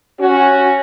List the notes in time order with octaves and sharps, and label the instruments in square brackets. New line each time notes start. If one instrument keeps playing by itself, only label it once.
[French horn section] C#4 F#4